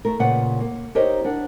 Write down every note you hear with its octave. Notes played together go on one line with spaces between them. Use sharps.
A3 A#4
A#2 C#3 F4 B4 F#5
A#3
D#4 G4 A#4 C5 C#5 D#5
D4 A#4 F#5